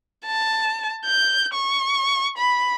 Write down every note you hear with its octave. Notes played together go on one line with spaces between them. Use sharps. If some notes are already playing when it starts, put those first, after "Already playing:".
A5
G6
C#6
B5